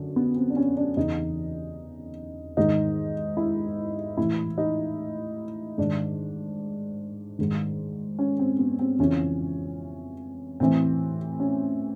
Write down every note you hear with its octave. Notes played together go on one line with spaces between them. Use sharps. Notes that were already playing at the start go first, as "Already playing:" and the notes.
Already playing: F#2 D3
B3
C4
D4
C#4
D4
E2 C#3 E3 D#4
G#2 D#3 D#4
E4
A2 E3 E4
D#4
G#2 D#3 D4
G#2 D#3
C#4
C4
B3
C4
F2 C#3 E3 C#4
A2 E3 C4
C#4